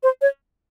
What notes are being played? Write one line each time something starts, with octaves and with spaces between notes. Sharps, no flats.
C5
C#5